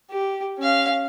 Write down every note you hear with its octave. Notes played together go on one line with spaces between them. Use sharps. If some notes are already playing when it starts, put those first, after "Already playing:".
G4
C#4 F5